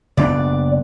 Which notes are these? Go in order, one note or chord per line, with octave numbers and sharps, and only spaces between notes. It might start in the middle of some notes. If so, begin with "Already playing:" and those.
F#1 B3 D4 D5